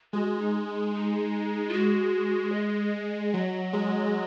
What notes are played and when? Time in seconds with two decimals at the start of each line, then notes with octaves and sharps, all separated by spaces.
0.13 G#3 F#4
0.39 D#4
0.66 D#4
0.94 D#4
1.69 F4
1.73 G#3 F#4
2.53 D#5
3.33 F#3 D#5
3.73 G#3